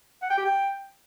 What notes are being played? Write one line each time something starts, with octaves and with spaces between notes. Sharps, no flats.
F#5
G5
G4
G5